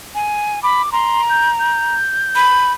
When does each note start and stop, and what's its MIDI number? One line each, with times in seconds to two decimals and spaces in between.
0.15 0.62 80
0.63 0.82 83
0.63 0.90 86
0.92 1.95 82
0.92 1.22 84
1.29 1.49 91
1.59 2.73 91
2.35 2.72 83